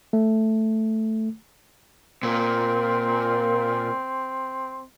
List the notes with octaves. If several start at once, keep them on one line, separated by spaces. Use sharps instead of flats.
A3
A#2 C4